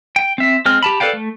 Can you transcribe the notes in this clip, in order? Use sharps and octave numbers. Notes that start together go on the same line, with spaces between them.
G5
C4 E5
G#3 C4 F6
G4 A5 B5
A4 B4 D5 F5 G5
A3